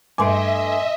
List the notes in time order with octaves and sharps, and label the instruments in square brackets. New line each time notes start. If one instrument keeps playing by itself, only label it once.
[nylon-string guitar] G2 A3 [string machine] D#5 E5 [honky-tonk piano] G#5 C6 D7 [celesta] D6